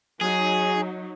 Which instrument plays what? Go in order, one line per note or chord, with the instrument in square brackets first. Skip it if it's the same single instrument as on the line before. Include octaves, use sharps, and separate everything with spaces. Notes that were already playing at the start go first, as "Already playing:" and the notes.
[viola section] F#3 D#4 [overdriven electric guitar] G#4